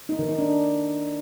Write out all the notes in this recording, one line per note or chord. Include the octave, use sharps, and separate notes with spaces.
D#4
D#3
D#4
D4